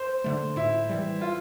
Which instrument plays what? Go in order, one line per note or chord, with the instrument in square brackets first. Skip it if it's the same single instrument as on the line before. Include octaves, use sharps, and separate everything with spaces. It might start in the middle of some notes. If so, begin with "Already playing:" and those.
Already playing: [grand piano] C5
[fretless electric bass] D3 A3
[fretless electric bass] A2 [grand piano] E4
[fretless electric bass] E3 G3
[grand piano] F4